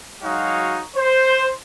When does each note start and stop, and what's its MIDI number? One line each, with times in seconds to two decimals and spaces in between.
0.23 0.81 54
0.23 0.81 56
0.23 0.81 63
0.23 0.81 66
0.23 0.81 73
0.23 0.81 77
0.96 1.51 72